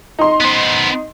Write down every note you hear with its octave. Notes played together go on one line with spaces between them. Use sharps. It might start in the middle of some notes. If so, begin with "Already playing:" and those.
D#4 C6
B3 C5